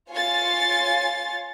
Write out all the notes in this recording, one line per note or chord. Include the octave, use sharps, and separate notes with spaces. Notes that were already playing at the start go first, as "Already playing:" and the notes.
F4 C#5 G#5 C6 A6